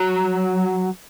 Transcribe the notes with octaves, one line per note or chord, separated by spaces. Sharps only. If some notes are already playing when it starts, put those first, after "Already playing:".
Already playing: F#3